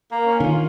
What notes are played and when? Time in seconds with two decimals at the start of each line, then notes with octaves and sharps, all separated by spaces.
0.11 A#3
0.27 C#4
0.40 D3
0.44 D#3 F4